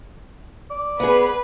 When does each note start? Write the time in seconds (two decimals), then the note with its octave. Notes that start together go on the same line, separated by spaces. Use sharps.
0.70 D5
1.00 B3 G#4 B4